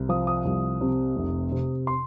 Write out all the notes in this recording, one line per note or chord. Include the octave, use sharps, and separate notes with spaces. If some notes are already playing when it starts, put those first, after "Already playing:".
Already playing: C2
F3 D#6
D#6
C2
C3
F1
C3
C6